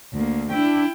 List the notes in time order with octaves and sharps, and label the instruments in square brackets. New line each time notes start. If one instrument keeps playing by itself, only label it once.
[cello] D2 A#3
[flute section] D4 [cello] E4 G5